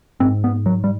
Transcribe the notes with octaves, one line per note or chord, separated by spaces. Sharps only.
G#2 C4
B3
F#3
G3